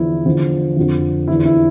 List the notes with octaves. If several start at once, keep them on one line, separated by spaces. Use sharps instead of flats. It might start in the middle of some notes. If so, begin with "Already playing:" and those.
Already playing: E2 D3 F3 E4
E2 D3 F3
F2 D3 F3
E2 D3 F3 E4
E4